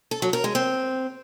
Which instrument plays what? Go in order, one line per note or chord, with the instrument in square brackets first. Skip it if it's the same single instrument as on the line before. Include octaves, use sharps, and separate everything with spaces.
[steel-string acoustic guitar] A4
F#3
A#4
G#3
C4